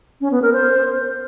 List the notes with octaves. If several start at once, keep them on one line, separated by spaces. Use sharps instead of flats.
C#4
B3
A#4
C5